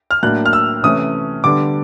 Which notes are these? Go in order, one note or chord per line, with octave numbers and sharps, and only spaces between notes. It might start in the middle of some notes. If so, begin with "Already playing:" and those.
F6
A2 F#3 A#3 D4 F#6
F6
E6
C3 E3 A3 C#4 D#6
D3 G3 B3 D4 D6